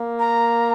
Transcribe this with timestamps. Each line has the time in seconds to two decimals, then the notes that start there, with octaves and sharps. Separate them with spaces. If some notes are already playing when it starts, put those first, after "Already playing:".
Already playing: A#3
0.19 A#5